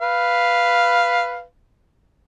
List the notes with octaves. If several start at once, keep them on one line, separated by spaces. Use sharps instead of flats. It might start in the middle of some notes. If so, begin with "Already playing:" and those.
B4 F5